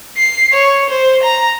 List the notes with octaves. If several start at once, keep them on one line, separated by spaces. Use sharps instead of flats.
C7
C#5
C5
A#5